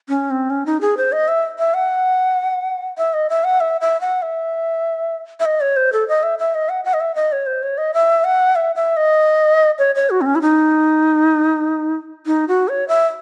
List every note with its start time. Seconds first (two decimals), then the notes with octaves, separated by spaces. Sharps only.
0.09 C#4
0.31 C4
0.50 C#4
0.66 D#4
0.81 G#4
0.97 C5
1.12 D#5
1.28 E5
1.59 E5
1.74 F#5
2.98 E5
3.14 D#5
3.30 E5
3.44 F#5
3.60 E5
3.81 E5
4.01 F#5
4.22 E5
5.40 E5
5.46 D#5
5.61 C#5
5.76 C5
5.93 A4
6.08 D#5
6.23 E5
6.39 E5
6.55 D#5
6.69 F#5
6.85 F#5
6.94 D#5
7.00 E5
7.16 D#5
7.32 C#5
7.47 C5
7.63 C#5
7.78 D#5
7.94 E5
8.24 F#5
8.55 E5
8.75 E5
8.97 D#5
9.79 C#5
9.95 C#5
10.10 F#4
10.21 C4
10.26 C#4
10.35 E4
10.42 D#4
12.26 D#4
12.48 F#4
12.68 C#5
12.88 E5